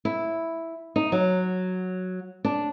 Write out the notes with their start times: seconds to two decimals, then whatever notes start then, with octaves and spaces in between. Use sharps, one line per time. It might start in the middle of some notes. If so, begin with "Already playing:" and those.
0.05 E4
0.96 D#4
1.12 F#3
2.45 D4